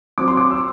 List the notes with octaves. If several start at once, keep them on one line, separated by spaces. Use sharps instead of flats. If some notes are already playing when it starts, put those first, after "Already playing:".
F#3 C4 D6
C6
D6
E6